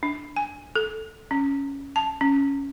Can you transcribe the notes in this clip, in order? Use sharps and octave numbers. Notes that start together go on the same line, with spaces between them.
D4
G#5
A4
C#4
A5
C#4